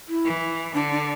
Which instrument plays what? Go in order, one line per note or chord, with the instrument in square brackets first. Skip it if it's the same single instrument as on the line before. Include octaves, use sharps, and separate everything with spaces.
[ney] E4
[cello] E3
[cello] D3 [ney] D4
[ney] D4